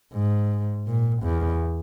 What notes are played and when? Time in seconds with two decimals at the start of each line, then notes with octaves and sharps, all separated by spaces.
0.13 G#2
0.87 A#2
1.23 E2